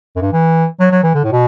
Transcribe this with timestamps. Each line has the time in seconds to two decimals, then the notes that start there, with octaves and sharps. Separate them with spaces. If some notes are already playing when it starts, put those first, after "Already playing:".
0.16 F#2
0.22 G2
0.33 E3
0.80 F#3
0.91 F#3
1.03 E3
1.15 D3
1.24 A2
1.32 B2